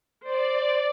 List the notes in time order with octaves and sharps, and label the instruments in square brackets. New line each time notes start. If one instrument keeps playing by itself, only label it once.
[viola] C5 [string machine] D5